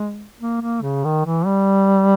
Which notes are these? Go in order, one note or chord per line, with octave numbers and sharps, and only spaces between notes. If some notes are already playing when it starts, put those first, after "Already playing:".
Already playing: G#3
A#3
A#3
C#3
D#3
E3
G3